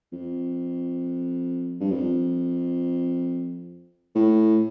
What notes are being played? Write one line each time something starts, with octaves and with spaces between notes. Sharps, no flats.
F2
G2
F2
A2